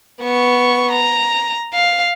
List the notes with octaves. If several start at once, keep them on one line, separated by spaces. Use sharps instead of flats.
B3 C#6
A#5
F5